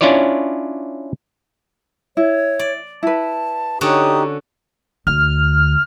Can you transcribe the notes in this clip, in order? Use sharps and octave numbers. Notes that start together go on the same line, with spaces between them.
C#4 D4 E4 F4 C#5 D5
E4 C#5
D5
E4 B4 A5
D3 C#4 D#4 F#4 G4 D#6
D2 F6